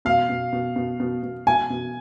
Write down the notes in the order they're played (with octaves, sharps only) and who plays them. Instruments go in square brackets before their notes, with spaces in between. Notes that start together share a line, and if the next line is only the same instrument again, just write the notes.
[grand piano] B2 [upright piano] F5
[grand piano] B2
B2
B2
B2
B2
[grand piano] B2 [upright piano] G#5
[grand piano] B2